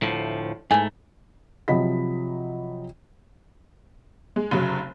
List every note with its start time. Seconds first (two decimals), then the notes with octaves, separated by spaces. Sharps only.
0.02 D2 A2 F3
0.71 G#2 A3 E4 B4 G#5
1.68 C3 F3 F#3 D#5 B5 B6
4.36 G#3
4.51 F1 C#3 F#3